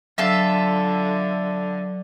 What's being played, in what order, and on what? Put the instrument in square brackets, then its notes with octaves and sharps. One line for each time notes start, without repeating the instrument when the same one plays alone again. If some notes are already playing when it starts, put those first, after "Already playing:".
[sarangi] D3 [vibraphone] F#3 [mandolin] F4 A4 E5